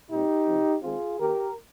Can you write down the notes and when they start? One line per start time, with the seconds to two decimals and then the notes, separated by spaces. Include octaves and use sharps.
0.10 A#2 G3 C4 D#4 G4
0.47 C3 F3 C4
0.83 D#3 G#3 C4 F4 G#4
1.19 D#3 A#3 G4 A#4